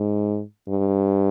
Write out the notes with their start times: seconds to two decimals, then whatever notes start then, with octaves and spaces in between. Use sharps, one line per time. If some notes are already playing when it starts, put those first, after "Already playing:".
Already playing: G#2
0.69 G2